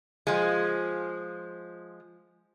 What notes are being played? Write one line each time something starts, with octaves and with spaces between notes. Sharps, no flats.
F3 G#3